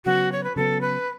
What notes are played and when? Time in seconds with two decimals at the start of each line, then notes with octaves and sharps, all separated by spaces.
0.05 C#3 F#3 B3 F#4
0.32 C#5
0.44 B4
0.56 C#3 F#3 B3 A4
0.81 B4